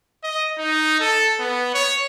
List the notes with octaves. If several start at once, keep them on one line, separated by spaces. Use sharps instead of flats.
D#5
D#4
A4
B3
C#5